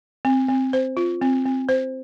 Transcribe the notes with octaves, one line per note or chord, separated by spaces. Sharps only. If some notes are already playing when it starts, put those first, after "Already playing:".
C4
C4
C5
F4
C4
C4
C5